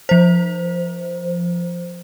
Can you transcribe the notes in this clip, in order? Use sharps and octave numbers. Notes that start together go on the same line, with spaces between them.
F3 C5